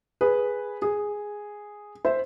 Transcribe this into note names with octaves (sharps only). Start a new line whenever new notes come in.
G#4 B4
G#4
C5 E5